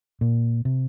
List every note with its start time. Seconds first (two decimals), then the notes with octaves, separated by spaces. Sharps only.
0.21 A#2
0.65 C3